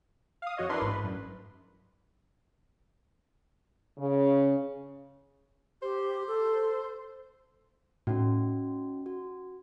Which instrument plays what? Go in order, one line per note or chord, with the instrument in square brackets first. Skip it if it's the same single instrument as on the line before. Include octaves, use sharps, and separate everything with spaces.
[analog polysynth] F5 D#6
F2 F#4 C#5 D#5
D4 E4 A#4 B4 C6
A1 G#2 B4
F#2
[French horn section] C#3
[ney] G4 [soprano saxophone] C5
[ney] A4
[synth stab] A2 [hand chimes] C#4 D#4 F#4
[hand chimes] F#4